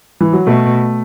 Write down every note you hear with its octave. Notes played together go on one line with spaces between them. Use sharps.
E3
F#3
B2 A3